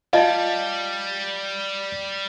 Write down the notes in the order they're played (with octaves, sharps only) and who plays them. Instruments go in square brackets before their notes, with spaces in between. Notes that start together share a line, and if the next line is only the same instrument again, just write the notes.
[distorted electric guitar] G3 [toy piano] F4 D#5 [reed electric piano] F5 A5 A6